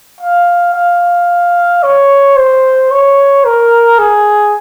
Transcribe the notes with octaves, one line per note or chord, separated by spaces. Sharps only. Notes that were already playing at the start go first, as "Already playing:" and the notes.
F5
F5
C#5
C5
C#5
A#4
G#4